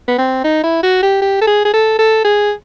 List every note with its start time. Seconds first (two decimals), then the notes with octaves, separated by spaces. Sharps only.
0.08 B3
0.18 C4
0.44 D#4
0.64 E4
0.83 F#4
1.03 G4
1.22 G4
1.42 A4
1.47 G#4
1.65 G#4
1.74 A4
1.99 A4
2.25 G#4